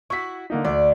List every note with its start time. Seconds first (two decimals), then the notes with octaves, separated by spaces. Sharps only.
0.10 E4 F#4 C#6 E6 B6
0.50 D3 A#3 D#4
0.65 D2 D5